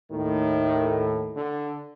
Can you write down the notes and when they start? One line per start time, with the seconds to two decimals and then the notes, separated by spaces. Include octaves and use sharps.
0.11 D#2 A2 D#3
1.36 D3